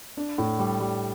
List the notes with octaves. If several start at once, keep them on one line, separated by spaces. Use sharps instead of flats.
D4
A2
G3
G3